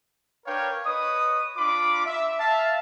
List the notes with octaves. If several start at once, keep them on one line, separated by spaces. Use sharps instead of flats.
D4 A#4 B4 C#5 F5 G5
B4 C#5 D#5 D#6
D4 F4 B5 D6
E5
E5 F5 A5